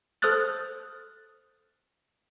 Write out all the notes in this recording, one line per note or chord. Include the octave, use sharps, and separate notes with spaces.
A4 C5 D#6 F6 F#6 A6